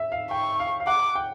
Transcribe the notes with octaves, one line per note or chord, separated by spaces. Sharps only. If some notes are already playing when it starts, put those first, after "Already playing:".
Already playing: E5
F5
G5 C#6
F5
F5
F#5 D6
G5